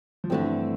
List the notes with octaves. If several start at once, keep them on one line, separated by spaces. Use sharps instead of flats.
F3
G2 D3 E3 A3 C4